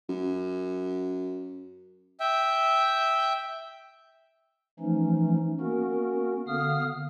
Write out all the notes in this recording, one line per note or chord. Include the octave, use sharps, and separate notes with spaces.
F#2
E5 G5
E3 F3 A3 C#4 D#4
A#3 B3 C#4 F#4 A#4
D3 B3 F5 D#6 F6